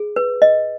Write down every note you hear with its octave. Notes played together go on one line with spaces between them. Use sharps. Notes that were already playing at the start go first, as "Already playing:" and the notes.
Already playing: G#4
B4
D#5